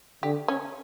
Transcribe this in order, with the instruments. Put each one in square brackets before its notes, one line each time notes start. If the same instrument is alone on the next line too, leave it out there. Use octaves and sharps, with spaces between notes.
[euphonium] D3 [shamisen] G4
[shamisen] C#4